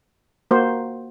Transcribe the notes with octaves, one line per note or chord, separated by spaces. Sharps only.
A#3 F#4 C5